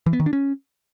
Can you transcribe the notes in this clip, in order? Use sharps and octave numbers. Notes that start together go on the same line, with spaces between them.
E3
B3
D#3
D4
C#4